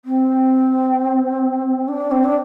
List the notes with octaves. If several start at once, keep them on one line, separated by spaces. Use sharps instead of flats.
C4
D4
C4
D4